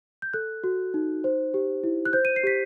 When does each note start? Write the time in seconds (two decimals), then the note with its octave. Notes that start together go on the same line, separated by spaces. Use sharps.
0.22 G6
0.33 A4 F#6
0.64 F#4
0.94 D#4
1.24 C5
1.54 G4
1.84 E4
2.05 F#6
2.13 C5 G6
2.25 D#7
2.36 C7
2.43 G4 B6